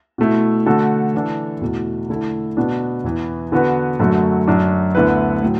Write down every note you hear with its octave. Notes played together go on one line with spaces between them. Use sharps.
B2 A3 E4
D3 A3 F#4 A4
E3 D4 A4
E2 B2 A3
D3 A3 E4 A4
B2 B3 D4
E2 E3 B3
D3 B3 F#4 B4
F#2 D3 F#3 A3 F#4
F#2 F#3 D4
D2 D3 B3 E4 B4
A2 F#3